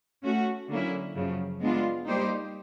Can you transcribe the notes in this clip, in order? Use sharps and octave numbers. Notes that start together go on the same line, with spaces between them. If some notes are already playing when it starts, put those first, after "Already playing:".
A3 C#4 F#4
D3 F#3 A#3 C#4 E4
F#2 C#3 F3
G#3 B3 D4 F4
G3 A#3 D#4 G4 C5